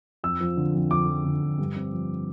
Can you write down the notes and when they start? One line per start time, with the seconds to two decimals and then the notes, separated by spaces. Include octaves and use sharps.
0.24 F2 E6
0.40 F3
0.57 D3
0.74 F2
0.91 F2 D6
1.08 F3
1.26 D3
1.42 F2
1.59 G2
1.76 C4
1.93 F3